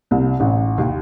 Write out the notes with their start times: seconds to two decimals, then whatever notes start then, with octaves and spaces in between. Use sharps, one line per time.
0.11 C2
0.40 A1
0.78 D#2